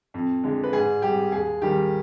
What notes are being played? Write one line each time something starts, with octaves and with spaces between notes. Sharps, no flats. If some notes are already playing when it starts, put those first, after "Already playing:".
F2
D3 G#3
B4
G#2 G#4
G3 G4
D#2 G#4
D#3 G3 G4